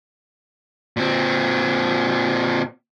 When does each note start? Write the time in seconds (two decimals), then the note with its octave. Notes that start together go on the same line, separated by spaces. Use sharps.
0.97 A#2 C4